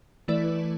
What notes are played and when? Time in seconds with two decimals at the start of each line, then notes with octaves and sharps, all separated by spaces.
0.28 E3 A3 E4 B4 D5